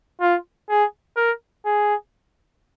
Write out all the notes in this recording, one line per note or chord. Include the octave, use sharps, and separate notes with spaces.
F4
G#4
A#4
G#4